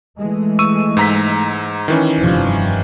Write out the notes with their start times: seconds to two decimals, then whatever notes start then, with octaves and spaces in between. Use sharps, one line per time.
0.18 E3 G#3 A3
0.59 C#6 E6 D#7
0.97 G#2 A#5 B6
1.88 D#3 E3 C#4
2.19 F1 G2 F3